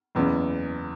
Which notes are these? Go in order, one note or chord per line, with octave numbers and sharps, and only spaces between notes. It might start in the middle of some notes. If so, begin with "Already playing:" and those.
F#1 E2 C#3